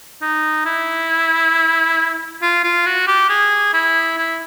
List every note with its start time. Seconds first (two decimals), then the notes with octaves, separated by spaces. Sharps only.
0.22 D#4
0.65 E4
2.42 F4
2.63 F4
2.86 F#4
3.07 G4
3.29 G#4
3.73 E4
4.17 E4